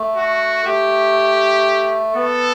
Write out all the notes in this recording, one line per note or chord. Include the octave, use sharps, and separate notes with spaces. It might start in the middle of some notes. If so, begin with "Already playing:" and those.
Already playing: A3
F#4
A3 G4
B3 A4